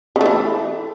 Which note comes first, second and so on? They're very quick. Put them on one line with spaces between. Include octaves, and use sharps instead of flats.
C#3 A3 E3